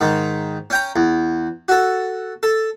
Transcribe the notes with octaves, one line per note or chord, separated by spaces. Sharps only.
G#2 D#3
C#4 G5 A#5
E2
F#4 A4
A4